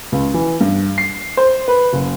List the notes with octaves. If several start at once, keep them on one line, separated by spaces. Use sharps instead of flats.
C#2
E3
G2
C7
C5
B4
F#1